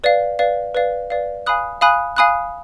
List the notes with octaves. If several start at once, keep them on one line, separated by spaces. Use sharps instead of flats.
B4 D5 F5
B4 D5 F5
B4 D5 F5
B4 D5 F5
F5 G#5 B5 D#6 F#6
F5 G#5 B5 D#6 F#6
F5 G#5 B5 D#6 F#6